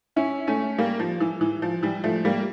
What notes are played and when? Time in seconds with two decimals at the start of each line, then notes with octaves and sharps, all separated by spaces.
0.16 C#4 E4
0.47 A3 C#4
0.78 G3 A#3
1.00 F3
1.21 E3
1.41 E3
1.62 F3
1.83 E3 G3
2.04 F3 A3
2.25 G3 A#3